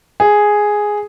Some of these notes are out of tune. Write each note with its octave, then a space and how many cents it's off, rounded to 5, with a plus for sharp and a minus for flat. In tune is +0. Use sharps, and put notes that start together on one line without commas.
G#4 +0